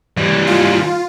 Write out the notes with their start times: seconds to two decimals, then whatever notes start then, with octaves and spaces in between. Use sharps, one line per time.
0.17 E3 G3
0.47 F4